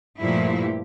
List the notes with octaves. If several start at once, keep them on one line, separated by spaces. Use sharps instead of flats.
G2 A#2 F3 A3 E4 G4